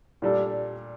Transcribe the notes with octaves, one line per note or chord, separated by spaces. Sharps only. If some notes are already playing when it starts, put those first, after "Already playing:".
A#2 G3 D4 A4